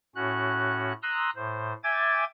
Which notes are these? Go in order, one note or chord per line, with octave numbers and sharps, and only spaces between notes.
A2 C#4 F#4 F#6
A#5 C6 D#6 E6 F#6
A2 C5
E5 G5 G#5 D6 G#6 A6